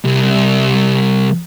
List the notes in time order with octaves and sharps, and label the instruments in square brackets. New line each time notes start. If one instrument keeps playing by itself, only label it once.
[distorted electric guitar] C2